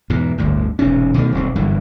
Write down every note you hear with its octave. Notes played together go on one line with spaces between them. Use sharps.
E2 G#2 B2
G1 D2 A2
E1 G#2 C3 C#4
B2 D3 D#3 A3
D#1 B1 C4
F#1 G2 D3 E3